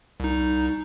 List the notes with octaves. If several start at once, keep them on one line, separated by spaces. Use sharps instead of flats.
C2 D#4